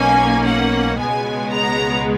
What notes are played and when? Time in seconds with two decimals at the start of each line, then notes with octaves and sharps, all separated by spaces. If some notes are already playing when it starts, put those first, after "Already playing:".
Already playing: B1 B2 A#3 C#4 G#5
0.46 F#5
0.98 C#2 B2 G#3 B3 G#5
1.51 A#5